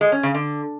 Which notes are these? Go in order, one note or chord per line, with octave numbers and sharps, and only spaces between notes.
G#3
C#4
C#3
D3